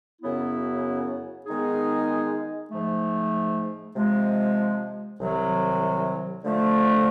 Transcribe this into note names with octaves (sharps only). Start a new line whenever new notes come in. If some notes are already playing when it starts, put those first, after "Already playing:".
F#2 C#3 F#3 B3 E4
D#3 G#3 B3 D#4 G#4
G#2 F3 A3
C3 F3 G#3
C2 C3 D#3 F#3
D3 F3 A3